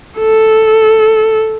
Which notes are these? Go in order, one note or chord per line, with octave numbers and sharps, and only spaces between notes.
A4